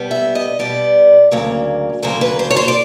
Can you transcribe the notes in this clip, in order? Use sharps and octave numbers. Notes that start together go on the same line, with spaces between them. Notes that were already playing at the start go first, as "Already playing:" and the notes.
Already playing: B2 G3 B3
E5
D#5
B2 G3 B3 D5
D2 C#3 F#3 A#3
D2 C#3 F#3 A#3 C5
B4
C5
C#5
C5
D5